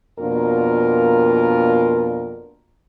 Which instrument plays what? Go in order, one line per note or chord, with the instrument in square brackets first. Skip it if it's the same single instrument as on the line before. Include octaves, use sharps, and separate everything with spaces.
[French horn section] F2 B2 A#3 D4 F4 A#4